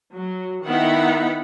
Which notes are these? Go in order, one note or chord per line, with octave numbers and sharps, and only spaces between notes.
F#3
D#3 B3 E4 F#5 B5